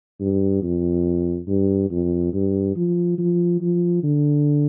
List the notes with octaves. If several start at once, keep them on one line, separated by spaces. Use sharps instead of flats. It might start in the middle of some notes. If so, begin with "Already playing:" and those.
G2
F2
G2
F2
G2
F3
F3
F3
D3